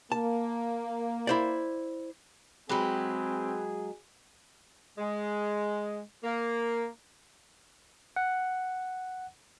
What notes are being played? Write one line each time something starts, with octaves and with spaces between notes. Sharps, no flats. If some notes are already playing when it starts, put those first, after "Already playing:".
A#3 A5
E4 C5 D5
F#3 G#3 C4 G4 G#4 B4
G#3
A#3
F#5